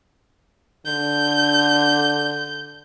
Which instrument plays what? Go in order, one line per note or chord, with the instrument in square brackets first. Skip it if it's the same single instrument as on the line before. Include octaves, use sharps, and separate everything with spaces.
[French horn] D3 [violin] G6